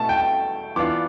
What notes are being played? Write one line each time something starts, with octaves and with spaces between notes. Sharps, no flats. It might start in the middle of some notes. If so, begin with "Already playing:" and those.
Already playing: B2 A3 E4 A5
G5
E3 B3 D4 F4 D6